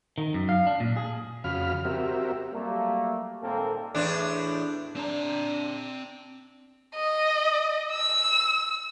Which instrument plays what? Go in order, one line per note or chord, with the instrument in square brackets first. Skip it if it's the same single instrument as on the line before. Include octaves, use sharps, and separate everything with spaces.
[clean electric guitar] D#3
F#2
F5
D4
A#2
G#4
[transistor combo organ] F2 C#3 F#4 F5 B5 F6
C4 F#4 G4 A#4 E5
[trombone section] F#3 G3 A3 A#3
G#1 A#2 A#3 C4 A4
[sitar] E2 A2 D4
[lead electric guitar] C4 A#5 [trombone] D4
[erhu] D#5
E6